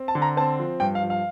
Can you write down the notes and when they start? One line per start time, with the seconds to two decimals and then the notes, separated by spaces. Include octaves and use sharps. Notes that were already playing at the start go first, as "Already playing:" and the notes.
Already playing: C4
0.08 A5
0.15 D3
0.22 A#5
0.37 C4 A5
0.59 F3
0.80 G2 G5
0.95 F5
1.03 F3
1.10 F5